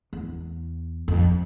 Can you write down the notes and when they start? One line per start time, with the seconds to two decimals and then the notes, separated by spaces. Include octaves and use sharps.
0.13 E2
1.08 F2